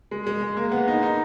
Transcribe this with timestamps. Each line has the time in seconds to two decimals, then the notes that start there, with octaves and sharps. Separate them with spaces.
0.11 G#3
0.27 G#3
0.42 G#3
0.57 A#3
0.72 B3
0.88 D#4
1.03 D#4